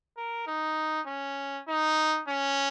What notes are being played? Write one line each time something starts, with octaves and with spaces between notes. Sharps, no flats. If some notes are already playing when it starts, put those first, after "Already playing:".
A#4
D#4
C#4
D#4
C#4